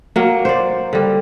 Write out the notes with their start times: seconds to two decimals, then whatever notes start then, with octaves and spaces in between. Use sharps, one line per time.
0.16 F#3 A#3
0.45 C5 D5
0.93 D3 G3